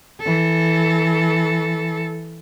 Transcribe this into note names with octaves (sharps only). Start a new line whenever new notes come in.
E3 A4